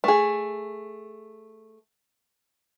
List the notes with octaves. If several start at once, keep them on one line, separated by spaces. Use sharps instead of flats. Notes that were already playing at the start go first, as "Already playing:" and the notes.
A3 G#4